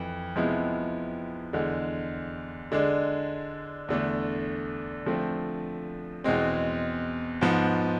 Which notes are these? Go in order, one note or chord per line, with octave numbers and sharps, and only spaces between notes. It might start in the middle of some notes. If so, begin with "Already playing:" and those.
Already playing: F2 E3
C3 F3 G#3 B3 E4
E2 D3 G#3
D3 G#3 D4
E2 D3 A3 D4
D3 F3 A3 C4
E2 B2 G#3 C4
G#2 F3 B3